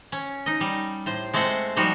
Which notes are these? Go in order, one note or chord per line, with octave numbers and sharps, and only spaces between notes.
C#4
D#4 D#5
G3
A2 C5
G#3 A3 C4 C5 F#5
F3 G3 A#3 D#4 F#4